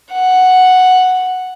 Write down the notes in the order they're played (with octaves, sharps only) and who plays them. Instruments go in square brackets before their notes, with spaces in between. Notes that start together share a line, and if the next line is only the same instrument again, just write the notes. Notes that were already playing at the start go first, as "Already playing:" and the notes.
[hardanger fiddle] F#5